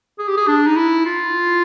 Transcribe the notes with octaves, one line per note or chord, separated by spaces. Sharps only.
G#4
G4
G#4
D4
D#4
E4
F4